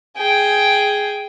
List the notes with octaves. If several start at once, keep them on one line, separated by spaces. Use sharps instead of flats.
G#4 G5